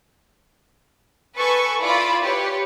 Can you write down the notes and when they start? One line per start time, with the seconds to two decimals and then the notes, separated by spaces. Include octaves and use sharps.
1.38 A4 B4 G#5 C#6
1.81 E4 F4 D5 B5
2.23 G4 B4 C#5